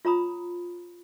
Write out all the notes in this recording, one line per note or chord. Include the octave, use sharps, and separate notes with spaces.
F4 C#5 A#5 B5 D#6